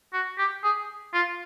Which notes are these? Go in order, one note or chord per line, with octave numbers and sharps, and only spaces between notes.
F#4
G4
G#4
F4